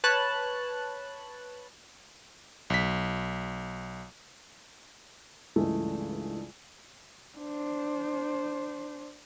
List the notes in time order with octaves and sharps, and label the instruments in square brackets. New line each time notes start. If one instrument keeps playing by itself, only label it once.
[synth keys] B4 C#5 A5 F#6
[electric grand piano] B1 B6
[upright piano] C#2 G2 C#3 E3 G#3 A3
[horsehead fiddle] D4 C5